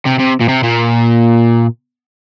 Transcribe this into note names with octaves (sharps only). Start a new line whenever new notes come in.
C3
C3
A#2
C3
A#2